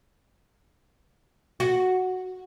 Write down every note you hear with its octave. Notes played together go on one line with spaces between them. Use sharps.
F#4